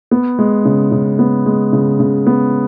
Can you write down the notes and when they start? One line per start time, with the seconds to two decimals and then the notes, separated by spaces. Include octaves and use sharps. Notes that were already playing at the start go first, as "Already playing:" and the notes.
0.11 B3
0.39 G#3
0.65 C#3
0.92 C#3
1.19 B3
1.46 G#3
1.73 C#3
2.00 C#3
2.27 B3